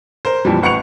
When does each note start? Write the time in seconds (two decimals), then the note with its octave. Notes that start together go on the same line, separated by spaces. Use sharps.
0.25 A#4 C5
0.45 F2 A#2 E3 G3
0.62 A1 F#5 C#6 C#7 F7